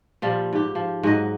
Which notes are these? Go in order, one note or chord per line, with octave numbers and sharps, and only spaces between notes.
A#2 F3 G3
G#2 G4
F3
G#2 F#3 D#5